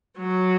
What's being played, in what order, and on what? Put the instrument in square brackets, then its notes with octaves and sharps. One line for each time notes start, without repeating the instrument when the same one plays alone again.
[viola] F#3